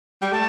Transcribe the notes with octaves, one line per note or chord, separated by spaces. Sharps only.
G3 G5
A3 A5